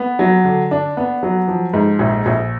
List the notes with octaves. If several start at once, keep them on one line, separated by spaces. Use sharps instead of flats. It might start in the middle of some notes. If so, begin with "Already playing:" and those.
Already playing: B3
F#3
D3
D4
B3
F#3
F3
G#2
A#1
A#1